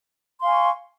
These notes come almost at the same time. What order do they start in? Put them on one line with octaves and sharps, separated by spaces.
C6 F5 G#5 C#6